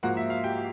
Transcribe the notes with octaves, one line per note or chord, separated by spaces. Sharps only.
G#2 F3 A#3 F#4 F#5
E5
F5
G4 G5